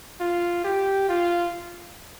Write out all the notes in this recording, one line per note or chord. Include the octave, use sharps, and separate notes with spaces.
F4
G4
F4